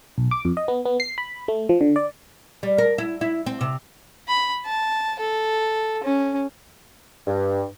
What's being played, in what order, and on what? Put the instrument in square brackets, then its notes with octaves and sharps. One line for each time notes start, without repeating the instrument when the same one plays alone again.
[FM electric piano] B1
D6
F2
D#5
B3
B3
C7
B5
A3
F3
D3
D5
[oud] G3
A#4
E4
E4
C4
C3
[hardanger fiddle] B5
A5
A4
C#4
[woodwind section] G2